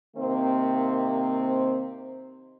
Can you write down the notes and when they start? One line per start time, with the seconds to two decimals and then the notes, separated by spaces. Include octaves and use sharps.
0.17 C3 D#3 A#3 C4